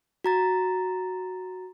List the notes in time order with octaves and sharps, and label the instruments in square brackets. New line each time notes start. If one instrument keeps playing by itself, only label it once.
[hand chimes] F#4 A#5 A6